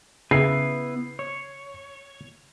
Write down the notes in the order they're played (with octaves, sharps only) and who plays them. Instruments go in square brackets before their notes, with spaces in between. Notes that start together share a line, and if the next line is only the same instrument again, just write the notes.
[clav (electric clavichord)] C#3 [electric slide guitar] B3 E4 B4 [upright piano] C7
[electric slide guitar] C#5